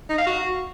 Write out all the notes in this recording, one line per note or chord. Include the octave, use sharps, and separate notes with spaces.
D#4
F5
F#4